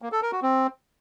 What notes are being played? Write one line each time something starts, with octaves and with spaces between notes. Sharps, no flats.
A#3
A4
A#4
F#4
C4